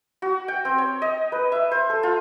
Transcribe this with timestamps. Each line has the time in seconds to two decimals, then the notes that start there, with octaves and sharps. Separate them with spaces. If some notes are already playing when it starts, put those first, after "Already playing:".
0.22 F#4
0.48 G5
0.65 C4
0.78 C#5
1.02 D#5
1.32 B4
1.52 E5
1.71 C5
1.90 A4
2.03 F4